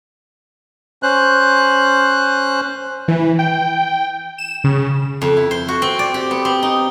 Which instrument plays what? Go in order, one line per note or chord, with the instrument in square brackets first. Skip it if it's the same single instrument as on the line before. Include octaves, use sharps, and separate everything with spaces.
[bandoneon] C#4 C5 F#6
[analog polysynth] E3
G5
E7
C#3
[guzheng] F2
E4
C5
F#4
C4
D5
G4
B3
C4
D#4